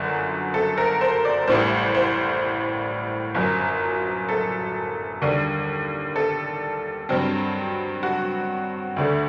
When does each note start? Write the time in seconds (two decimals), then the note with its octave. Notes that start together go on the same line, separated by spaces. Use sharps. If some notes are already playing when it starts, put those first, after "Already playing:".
Already playing: G1 F#2 D3 F#4
0.54 A4
0.78 A#4
1.01 C5
1.25 D5
1.48 A1 A2 G3 C5
1.95 C5
3.35 G1 F#2 F#3
4.29 A4
5.22 D#2 D3 G3
6.16 A4
7.09 G2 F#3 C4
8.03 F#4
8.96 D2 D3 A3